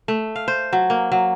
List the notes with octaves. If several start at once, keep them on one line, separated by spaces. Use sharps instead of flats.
A3
F5
C5
F#3
A#3
F#3